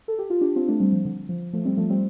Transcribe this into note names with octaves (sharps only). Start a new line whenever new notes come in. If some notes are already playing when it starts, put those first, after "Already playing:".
A4
G4
F4
D4 G4
C4 F4
A3 D4
G3 C4
F3
D3
F3
F3 A3
G3 C4
F3 A3
G3 C4